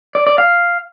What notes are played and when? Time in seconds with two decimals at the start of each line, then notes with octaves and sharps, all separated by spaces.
0.15 D5
0.27 D5
0.38 F5